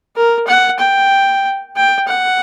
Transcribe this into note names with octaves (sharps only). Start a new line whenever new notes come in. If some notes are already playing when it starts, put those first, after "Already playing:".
A#4
F#5
G5
G5
F#5